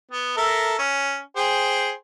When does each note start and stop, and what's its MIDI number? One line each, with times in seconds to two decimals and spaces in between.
0.12 0.35 59
0.37 0.79 69
0.37 0.79 70
0.37 0.79 76
0.79 1.19 61
1.36 1.91 68
1.36 1.91 72
1.36 1.91 79